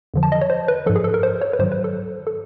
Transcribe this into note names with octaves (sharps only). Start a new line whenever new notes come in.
F2 D3 F3
A5
D#5
C#5
C5
B4
G#2 F3 A4
G#4
A4
A#4
C5
C#5
B4
G#2 D#3 F#3 C5
B4
A4
A4